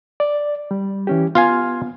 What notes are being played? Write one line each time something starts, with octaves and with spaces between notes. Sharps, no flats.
D5
G3
E3 C#4 G4
B3 F4 F5 G#5